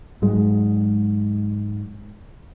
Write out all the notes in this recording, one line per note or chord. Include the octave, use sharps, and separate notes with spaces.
G#2 F#3 G#3